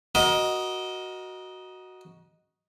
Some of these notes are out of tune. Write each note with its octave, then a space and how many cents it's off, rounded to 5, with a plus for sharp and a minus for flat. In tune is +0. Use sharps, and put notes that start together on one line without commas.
F#4 +0 A#4 +30 D#5 +0